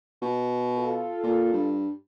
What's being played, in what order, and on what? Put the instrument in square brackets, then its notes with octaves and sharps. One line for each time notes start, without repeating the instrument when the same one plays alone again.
[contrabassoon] B2
[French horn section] F4 A4
[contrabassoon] A#2
G2